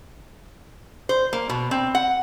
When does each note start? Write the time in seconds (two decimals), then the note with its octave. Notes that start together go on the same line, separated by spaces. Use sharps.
1.09 C5
1.33 A#3
1.49 B2
1.71 C4
1.95 F#5